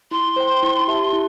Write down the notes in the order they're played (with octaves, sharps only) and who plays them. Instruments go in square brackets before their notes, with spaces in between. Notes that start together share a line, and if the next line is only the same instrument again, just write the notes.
[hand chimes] E4 [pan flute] C6
[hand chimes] C5 G5
E4
G4 E5 A5
E4